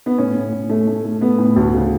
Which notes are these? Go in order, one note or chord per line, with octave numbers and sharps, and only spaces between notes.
B3
A2 C#4
A2
A2
A3
A3
A3
A3 B3
A2
D2
C#3